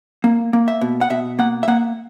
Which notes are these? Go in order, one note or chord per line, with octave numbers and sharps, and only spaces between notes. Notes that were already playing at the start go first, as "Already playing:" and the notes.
A#3
A#3
E5
B2
F#5
B2 E5
A#3 F#5
E5
A#3 F#5